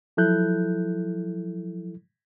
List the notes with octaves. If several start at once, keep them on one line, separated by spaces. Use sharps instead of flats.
F3 F#3 E4 A4 F#6 G6